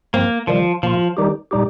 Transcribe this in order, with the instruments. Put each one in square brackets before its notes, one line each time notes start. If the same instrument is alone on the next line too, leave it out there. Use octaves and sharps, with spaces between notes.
[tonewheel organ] G2 F3 C4 [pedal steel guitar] A#3
[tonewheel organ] C3 D#3 G3 [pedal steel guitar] F3
[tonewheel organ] A#2 A#3 F4 [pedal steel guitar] F3
[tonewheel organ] D#3 G3 D#4 G4
A#2 G3 D#4 G4